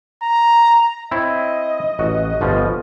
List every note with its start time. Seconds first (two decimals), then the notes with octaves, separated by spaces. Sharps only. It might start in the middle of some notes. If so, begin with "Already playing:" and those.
0.23 A#5
1.11 C4 E4 C#5 D#5
1.99 A1 F#4
2.41 G1 B2 F3